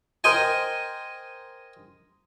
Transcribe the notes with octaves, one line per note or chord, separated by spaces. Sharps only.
A#4 C5 D#5 G5 G#5